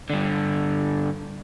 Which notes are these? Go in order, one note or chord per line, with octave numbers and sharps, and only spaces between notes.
G2 D3